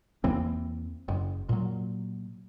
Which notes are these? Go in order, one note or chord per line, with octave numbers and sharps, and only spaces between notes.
E2 E3 A#3 C4
F#1
A#2 F#3